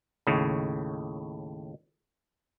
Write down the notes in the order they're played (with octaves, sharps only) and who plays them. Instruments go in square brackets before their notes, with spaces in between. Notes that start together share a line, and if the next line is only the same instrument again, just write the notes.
[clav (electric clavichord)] D#2 A2 C#3